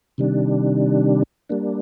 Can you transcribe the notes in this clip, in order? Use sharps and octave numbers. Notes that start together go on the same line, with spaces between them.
C3 D#3 G3 D4
G3 A#3 D4